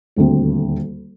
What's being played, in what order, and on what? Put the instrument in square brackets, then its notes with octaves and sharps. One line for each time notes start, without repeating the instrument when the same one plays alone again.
[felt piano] D#1 D2 C4